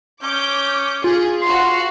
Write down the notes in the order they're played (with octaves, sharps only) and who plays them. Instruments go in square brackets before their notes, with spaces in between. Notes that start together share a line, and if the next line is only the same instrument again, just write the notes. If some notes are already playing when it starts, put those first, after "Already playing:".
[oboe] C#4 [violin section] D6 G6
[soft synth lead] F4 [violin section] G#4
[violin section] F#4 F5 [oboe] C6